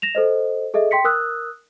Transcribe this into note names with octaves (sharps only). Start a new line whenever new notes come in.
A#6 E7 F7
A4 C5 D#5
G#4 A4 D#5 E5
G5 C6 B6 C#7
A#4 D#6 E6 F#6